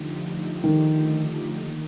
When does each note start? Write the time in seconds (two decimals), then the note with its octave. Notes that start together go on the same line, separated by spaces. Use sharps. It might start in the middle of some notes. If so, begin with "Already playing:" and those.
Already playing: D3 F3 A3 D#4 G4
0.64 D#3
1.55 D#3 A#3 D#4